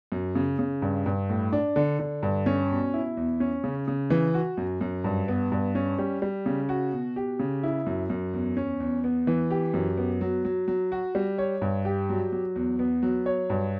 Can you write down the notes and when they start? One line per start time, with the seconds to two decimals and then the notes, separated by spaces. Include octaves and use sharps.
0.12 F#2
0.35 C#3
0.59 C#3
0.82 G2
1.06 G2
1.29 A2
1.53 D4
1.76 D3
2.00 D3
2.23 G2
2.46 C#4
2.70 B2
2.94 E4
3.17 E2
3.40 C#4
3.64 C#3
3.88 C#3
4.10 E3
4.34 F#4
4.57 F#2
4.81 F#2
5.04 G2
5.28 B3
5.52 G2
5.75 C#4
5.99 G3
6.22 G3
6.46 C#3
6.69 F#4
6.92 B2
7.16 G4
7.39 C#3
7.63 E4
7.86 F#2
8.10 F#2
8.33 E2
8.57 C#4
8.80 E2
9.04 B3
9.27 E3
9.50 G4
9.74 F#2
9.97 B3
10.21 F#3
10.45 F#3
10.68 F#3
10.92 F#4
11.15 G3
11.38 C#5
11.62 G2
11.85 G4
12.09 F#3
12.32 F#3
12.56 E2
12.79 B3
13.03 F#3
13.26 C#5
13.50 G2